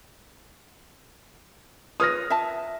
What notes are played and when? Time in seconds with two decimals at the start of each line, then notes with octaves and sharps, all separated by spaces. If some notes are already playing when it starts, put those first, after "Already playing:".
2.00 F4 B4 C#5 D#6 F6 A#6
2.30 E5 A5